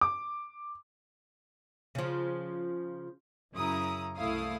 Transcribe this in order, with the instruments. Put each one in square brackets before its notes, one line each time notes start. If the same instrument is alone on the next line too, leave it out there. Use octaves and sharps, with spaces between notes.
[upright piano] D6
[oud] C#3 F3
[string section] F#2 C#3 E4 A#5 D#6
C2 A3 E4 F5 D#6